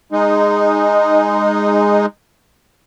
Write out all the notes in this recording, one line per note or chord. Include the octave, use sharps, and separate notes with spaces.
G#3 D#4